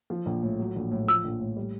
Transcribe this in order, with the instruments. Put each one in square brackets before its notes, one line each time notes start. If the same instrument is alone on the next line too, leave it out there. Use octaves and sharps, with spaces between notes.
[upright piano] F3
A#1
A2
F#3
A#1
A2
[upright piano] F3 [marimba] E6
[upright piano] A#1
A2
G3